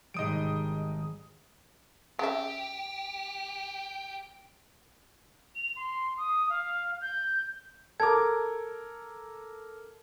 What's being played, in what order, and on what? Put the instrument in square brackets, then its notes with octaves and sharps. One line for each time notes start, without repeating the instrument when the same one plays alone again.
[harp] G#1 G3 [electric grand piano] D#5 D#6 D7
[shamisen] C#3 E5 [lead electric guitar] G4
[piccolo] F7
C6
D#6
F5
G6
[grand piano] A4 A#4 D6 [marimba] A5 [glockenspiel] G#6